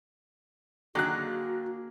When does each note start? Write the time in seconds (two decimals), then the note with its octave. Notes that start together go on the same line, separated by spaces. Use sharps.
0.95 D3 D#3 F#3 A#3 F#4 G#4 F#6